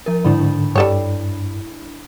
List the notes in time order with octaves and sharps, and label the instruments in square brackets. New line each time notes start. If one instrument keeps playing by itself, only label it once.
[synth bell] F3 A#4
[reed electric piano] G#2 D3 [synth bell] D4 E4 B5
[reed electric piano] G2 [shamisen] G3 A4 C#5